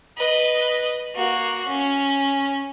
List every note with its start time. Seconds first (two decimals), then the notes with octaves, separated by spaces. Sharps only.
0.18 B4 D#5
1.15 A#3 F#4
1.68 C#4